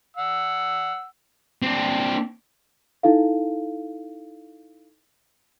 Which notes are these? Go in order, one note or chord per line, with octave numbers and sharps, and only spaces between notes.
F#5 E6
C4 D4
D#4 E4 A4 F5